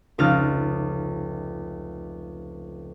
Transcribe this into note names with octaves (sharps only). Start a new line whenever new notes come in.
F1 C#2 D#4 F6 A6